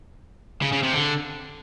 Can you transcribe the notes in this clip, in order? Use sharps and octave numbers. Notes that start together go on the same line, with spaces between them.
C#3
C#3
C3
D3